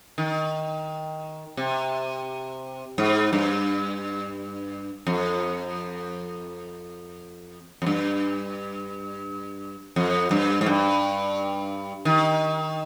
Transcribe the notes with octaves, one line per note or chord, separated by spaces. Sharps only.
D#3
C3
G#2
G2
F2
F2
G2
F2
G2
G#2
G2
D#3